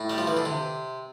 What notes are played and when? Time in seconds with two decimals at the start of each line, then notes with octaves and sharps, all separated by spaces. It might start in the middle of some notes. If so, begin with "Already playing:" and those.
Already playing: A2
0.10 G3
0.18 F3
0.27 E3
0.37 D3
0.45 C3